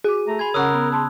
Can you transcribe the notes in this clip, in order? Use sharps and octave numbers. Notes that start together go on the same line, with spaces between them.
F#4 G#4 D6
A3 A#5
G#5 B5 C6 G#6
C#3 C#4 A#4 F#5 D#6 E6 F#6
B3
A5 C6